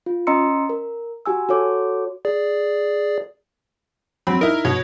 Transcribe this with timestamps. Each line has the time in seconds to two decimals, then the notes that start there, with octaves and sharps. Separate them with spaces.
0.06 F4
0.27 C#4 D#5 A#5 C6 E6 C#7
0.69 A#4
1.26 F#4 G4 G#5 E6
1.49 F#4 A4 C#5 D6
2.25 G#4 D5
4.27 F#3 C4 B5
4.41 D#4 E4 A#4
4.65 B2 C#5